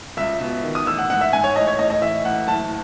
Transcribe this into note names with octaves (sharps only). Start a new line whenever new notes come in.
C#2 E5
B2
D#3
D#6
A1 E6
F#5
G#2 F#5
E5
G#2 G#5
C#5
A1 D#5
C#5
A2 D#5
D#5
E3 E5
A1 F#5
F#1 A5